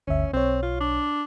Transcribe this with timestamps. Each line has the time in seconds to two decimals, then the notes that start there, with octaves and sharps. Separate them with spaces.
0.08 G1 D2 C#4 E5
0.33 B1 C4 C#5
0.63 F4
0.80 D4